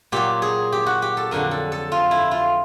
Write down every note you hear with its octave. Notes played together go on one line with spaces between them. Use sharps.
A#2 F#3 G4
G#4
G4
F#4
G4
A4
F2 D3 F#3 A#4
A4
A4
F4
E4
F4